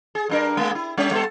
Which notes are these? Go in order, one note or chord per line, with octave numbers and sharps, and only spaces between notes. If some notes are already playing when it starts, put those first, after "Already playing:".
G#4
G2 D4 A#4
G#3 A#3
E4
G3 C#4
G3 B3 A4